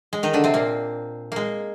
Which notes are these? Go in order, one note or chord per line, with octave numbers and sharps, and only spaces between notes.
G#3
D#3 D#4
D3 D4
C3 C4
A#2 A#3
G#3 A#3